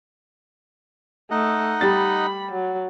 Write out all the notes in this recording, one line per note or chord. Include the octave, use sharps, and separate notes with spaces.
A3 D#4 D#5 F#5
G3 B5 A6
F#3